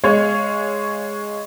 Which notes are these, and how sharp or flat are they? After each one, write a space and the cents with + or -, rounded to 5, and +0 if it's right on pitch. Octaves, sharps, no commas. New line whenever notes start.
G#3 +0 C#5 +0 F5 -25